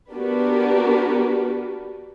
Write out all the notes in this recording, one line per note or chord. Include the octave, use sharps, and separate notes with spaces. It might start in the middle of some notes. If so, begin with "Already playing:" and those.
B3 D4 F#4 G4 A#4 B4